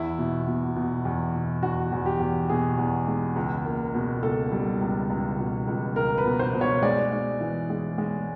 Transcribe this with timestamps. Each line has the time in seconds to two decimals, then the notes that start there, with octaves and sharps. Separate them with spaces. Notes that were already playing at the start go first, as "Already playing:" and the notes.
Already playing: E2 E4
0.18 B2
0.47 B2
0.76 B2
1.05 E2
1.34 B2
1.63 E2 F#4
1.92 E2
2.06 G4
2.20 E2
2.49 B2 G#4
2.78 E2
3.07 G#3
3.36 C#2
3.66 A#3
3.94 B2
4.23 C#2 A4
4.52 G3
4.81 C#2
5.10 C#2
5.38 B2
5.67 C#2
5.96 C#2 A#4
6.18 B4
6.26 B2
6.39 C5
6.54 B2
6.61 C#5
6.83 G#3 D5
7.12 G#3
7.40 E3
7.70 G#3
7.98 G#3